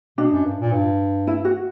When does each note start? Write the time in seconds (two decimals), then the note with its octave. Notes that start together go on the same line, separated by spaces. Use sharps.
0.18 B2 D4
0.32 F#2
0.45 G2
0.59 A#2
0.72 G2
1.27 E4
1.45 F#4